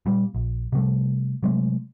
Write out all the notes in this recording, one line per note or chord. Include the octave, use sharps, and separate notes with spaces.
A#2 G3
A#1
C3 F3 G3 A3
C3 F#3 G#3 A3